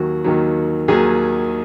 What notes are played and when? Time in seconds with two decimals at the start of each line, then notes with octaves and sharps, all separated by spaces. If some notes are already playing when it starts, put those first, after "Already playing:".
Already playing: D#2 D#3 F#3 F#4
0.24 D#2 D#3 F#3
0.88 D#2 D#3 F#3 G#4